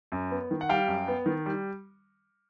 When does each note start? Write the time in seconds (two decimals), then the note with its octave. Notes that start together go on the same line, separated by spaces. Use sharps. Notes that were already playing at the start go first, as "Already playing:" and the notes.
0.12 F#2
0.31 B3
0.51 D#3
0.61 F#5
0.69 G3 F5 G5
0.88 F#2
1.08 B3
1.26 D#3
1.46 G3